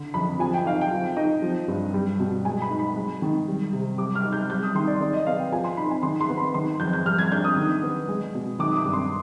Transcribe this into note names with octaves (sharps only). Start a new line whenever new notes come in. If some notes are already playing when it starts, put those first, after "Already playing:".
Already playing: D3
F2 B5
F3 G#5
G5
D#4 F5
G5
F3
D#4
F3
G2
G3
B2
G#3 G#5
B5
D#4
B5
G#3
D#3
G3
C3
G3 D6
F6
D#4
G6
G3 G6
D#6
D#3 C6
D5
D#3 D5
D#5
B3 F5
G5
F3 G#5
C6
D#4 B5
G#5
D#3 C6
C6
B3
B5
D#3 C6
F2 G6
G6
G3 F6
G#6
D4 G6
D#6
D#3
B3
G#3
B2
D#3 D6
D#6
D6
G2
C6